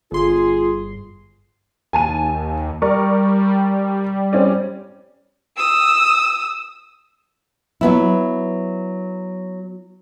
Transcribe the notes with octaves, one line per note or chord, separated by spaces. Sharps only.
G1 F4 G#4 C6
D#2 G#5 A5 D#7
G3 A#4 D5 C#6
C4 C#4 D5
D#6 E6
F#3 B3 E4